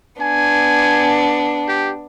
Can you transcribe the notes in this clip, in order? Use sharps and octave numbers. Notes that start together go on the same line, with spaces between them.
B3 D4 G#5
G4